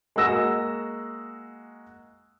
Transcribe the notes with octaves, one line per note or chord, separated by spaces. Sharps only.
G#3 A#3 F#4 E6 A#6 E7